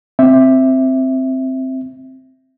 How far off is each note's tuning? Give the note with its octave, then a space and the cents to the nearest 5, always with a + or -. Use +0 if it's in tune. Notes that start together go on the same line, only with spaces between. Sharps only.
C4 +0 E5 +0